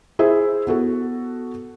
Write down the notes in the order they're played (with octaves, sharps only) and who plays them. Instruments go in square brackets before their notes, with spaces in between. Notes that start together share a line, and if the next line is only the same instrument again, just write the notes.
[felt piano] E4 G#4 C5 E5
B3 F#4 A4